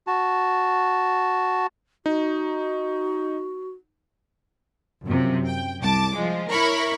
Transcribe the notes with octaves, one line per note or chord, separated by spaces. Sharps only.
F#4 A5
D#4 F#4
F#2 C3 F3
G5
C2 A5 D6
F3 G#3
E4 A#4 C#5 B5 C#6